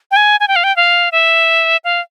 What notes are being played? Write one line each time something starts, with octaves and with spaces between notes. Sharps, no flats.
G5
G#5
G#5
G5
F5
G5
F5
E5
F5